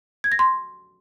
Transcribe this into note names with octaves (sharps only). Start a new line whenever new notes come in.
G#6
A#6
C6